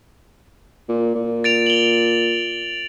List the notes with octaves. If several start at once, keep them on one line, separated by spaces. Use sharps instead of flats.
A#2
A#2
A6 D7 F7
F#7 G7